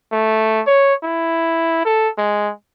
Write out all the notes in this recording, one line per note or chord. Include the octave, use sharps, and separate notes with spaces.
A3
C#5
E4
A4
G#3